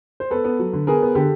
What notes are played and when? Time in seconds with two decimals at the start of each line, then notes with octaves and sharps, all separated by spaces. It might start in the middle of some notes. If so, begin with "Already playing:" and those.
0.20 C5
0.31 B3 A4 B4
0.45 B3
0.59 F#3
0.73 D3
0.87 B3 G#4 A#4
1.02 B3
1.15 D3 G4 A4